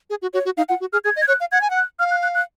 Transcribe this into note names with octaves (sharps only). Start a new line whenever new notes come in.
G#4
F#4
F#4 C#5
F#4
D#4 F5
F4 F#5
F#4
G#4 F6
G#4 G#6
D#5
G#6
C#5 F#6
F5
F#5 G#6
G#5
F#5
F#6
F5 F6
F#6
F#6
F#6